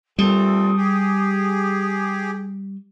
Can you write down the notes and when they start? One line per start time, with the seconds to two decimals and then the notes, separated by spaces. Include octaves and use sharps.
0.19 A#2 G3 A3 C4 D#6
0.77 G4 G#4